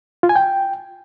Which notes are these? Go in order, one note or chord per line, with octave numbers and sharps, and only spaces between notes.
F4
G#5
G5